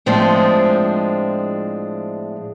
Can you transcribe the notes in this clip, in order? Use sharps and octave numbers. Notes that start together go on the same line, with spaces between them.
A2 F3 G#3 C4 D4 F4